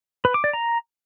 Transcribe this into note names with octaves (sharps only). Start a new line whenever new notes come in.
B4
D6
D5
A#5